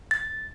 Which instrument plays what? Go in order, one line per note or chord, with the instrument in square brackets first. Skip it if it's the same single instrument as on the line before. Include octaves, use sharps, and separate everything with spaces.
[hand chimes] A6